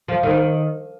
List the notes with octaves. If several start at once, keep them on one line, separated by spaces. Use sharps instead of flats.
F3
D#3